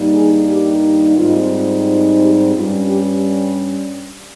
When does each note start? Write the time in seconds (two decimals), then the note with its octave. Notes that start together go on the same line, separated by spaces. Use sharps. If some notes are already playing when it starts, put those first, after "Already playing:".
Already playing: G2 D#3 G3 A#3 D#4
0.14 G#4
0.48 G4
1.17 G#2 G3 C4 D#4 F4
1.86 F4
2.19 G4
2.53 G2 G3 C#4 F4
2.88 G4